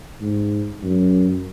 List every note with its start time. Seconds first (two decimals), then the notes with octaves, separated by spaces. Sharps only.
0.22 G#2
0.83 F#2